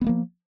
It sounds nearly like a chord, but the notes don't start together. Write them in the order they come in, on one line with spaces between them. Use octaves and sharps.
B3 G#3 A#3 F3